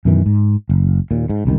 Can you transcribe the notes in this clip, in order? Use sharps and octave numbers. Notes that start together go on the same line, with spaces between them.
F#2 B2 D#3 E3
G#2
F#1
D#2 A#2
G#2
E1 C2 D#3